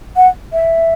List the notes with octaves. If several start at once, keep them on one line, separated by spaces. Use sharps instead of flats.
F#5
E5